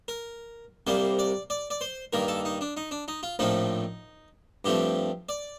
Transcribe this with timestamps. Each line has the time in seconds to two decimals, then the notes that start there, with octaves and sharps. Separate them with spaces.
0.08 A#4
0.87 C2 C3 G3 A#3 C5
1.19 D5
1.50 D5
1.70 D5
1.81 C5
2.13 G2 D#3 A#3 A#4
2.28 A4
2.45 D#4
2.61 D4
2.77 D#4
2.91 D4
3.08 D#4
3.23 F4
3.39 A#1 A2 F3 A3 C4 D#4
4.65 G2 F3 A3 C4 G4
5.29 D5